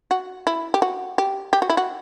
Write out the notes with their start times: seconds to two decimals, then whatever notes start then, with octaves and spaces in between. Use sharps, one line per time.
0.11 F#4
0.47 E4
0.74 G4
0.82 F#4
1.18 G4
1.53 G4
1.62 F#4
1.70 E4
1.77 F#4